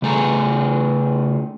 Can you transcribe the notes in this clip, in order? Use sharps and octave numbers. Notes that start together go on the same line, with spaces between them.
C#3 A3 G#4 A4 A#5